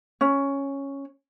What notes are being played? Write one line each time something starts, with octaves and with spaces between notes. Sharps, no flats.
C#4